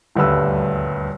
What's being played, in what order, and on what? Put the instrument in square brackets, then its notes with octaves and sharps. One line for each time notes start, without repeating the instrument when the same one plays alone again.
[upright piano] D#1 D2 G2 B4 E6